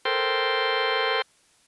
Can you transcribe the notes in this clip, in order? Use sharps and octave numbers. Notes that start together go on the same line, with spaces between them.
A4 A#4 C5 G5 C6